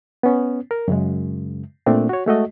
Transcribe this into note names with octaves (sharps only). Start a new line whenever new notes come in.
B3 C#4
A#4
F#2 C#3 G#3
A#2 A3 C4 D4
F#4 C#5
G#3 A3 F#4 D#5